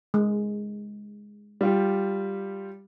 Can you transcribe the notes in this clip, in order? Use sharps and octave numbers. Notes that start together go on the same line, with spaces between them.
G#3
G3 F4 G4